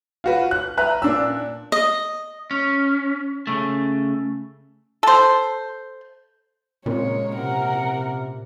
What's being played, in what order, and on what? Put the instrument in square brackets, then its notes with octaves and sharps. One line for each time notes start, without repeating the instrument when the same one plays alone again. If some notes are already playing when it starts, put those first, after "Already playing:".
[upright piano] F4 F#4 B4
F#6
B4 E5 A#5 F#6
A#2 D4 E6
[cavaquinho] D#5
[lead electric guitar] C#4
C#3 A3
[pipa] A4 C5
[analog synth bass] A#2 [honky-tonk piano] C#3 A#3 C4 [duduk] G#3 [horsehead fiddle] C#5
[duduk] C3 [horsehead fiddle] A#4 F#5